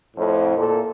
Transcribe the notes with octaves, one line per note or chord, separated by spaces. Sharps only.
F2 A2
A#2 A4